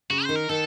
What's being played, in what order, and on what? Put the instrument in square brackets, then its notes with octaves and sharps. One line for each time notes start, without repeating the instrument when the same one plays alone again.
[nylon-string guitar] C#3 [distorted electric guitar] F#4
[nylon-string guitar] D#3 [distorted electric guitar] C5
[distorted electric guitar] A#4
[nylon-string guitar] D#3 [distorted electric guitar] A4